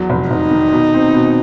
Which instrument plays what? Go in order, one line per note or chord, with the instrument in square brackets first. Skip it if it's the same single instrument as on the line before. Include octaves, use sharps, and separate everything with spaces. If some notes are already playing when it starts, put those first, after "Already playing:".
Already playing: [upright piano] E2 F#3
F1
[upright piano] F1 [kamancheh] D#4
[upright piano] D#3
B2
C4
B2